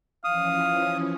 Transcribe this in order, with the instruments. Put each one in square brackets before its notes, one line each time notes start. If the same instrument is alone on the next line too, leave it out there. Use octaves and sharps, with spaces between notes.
[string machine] E3 F3 C#4 [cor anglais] F5 [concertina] D#6